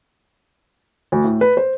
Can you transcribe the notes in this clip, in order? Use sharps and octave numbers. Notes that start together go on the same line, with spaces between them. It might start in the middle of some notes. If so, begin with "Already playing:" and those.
D2
A2
B4
C5